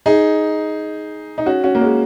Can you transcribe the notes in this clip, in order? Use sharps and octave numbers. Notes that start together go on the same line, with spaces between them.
D#4 G#4
D#4
C#4 F#4
C#4 F#4
A#3
G#3 C#4